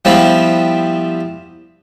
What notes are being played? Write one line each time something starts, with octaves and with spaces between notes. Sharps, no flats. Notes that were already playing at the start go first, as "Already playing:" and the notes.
F3 G3 B3 C4 E4